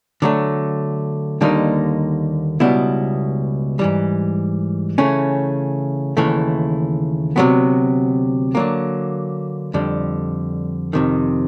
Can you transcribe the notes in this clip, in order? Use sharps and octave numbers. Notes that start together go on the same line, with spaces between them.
D3 F#3 A3
D#2 D3 G3 A#3 D#4
C#2 B2 G3 B3 E4
G#2 E3 G3
C#3 E3 A3 C#4
D#2 C#3 E3 A3
D2 C3 D#3 F#3 B3
D3 F#3 A#3
F2 D3 G3
F2 C3 D#3